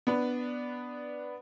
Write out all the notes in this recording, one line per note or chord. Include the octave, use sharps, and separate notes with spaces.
B3 D4 B4